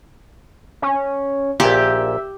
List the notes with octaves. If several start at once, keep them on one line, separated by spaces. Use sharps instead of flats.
C#4
A#1 A#2 G4 E5